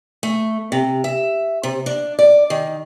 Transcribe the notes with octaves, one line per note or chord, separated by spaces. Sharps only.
A3
C3
E5
C3
D4
D5
D#3